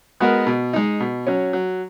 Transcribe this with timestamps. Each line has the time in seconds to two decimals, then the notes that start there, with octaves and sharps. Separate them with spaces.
0.20 G#3 B3 F#4 A#4
0.47 B2
0.73 G#3 D#4
1.00 B2
1.27 F#3 C#4
1.53 F#3